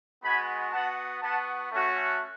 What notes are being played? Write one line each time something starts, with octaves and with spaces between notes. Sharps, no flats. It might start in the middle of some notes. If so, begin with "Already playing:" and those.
G#3 B3 F#4 G#5 B5
B3 F#4 F#5 A5
B3 F#4 F#5 A5
A3 C#4 F#4